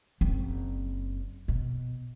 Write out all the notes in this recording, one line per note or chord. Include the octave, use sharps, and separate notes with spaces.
F#1 C4
B2